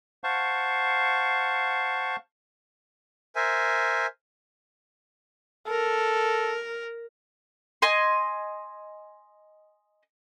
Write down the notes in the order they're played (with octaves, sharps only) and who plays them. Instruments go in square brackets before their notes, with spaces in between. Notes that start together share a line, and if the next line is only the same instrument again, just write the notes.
[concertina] C5 F5 F#5 A5 C#6
[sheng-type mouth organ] A#4 C5 E5 G#5
[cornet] A4 [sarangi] A#4
[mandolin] D#5 G#5 C6